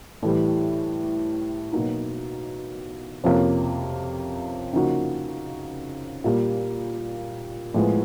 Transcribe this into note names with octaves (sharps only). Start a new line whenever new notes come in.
A2 E3 G3
B2 F#3 A#3 D#4
F2 C3 F3 A#3 C#4
C#3 F3 A#3 D#4 F#4
A#2 G3 A#3
A2 F3 G#3 B3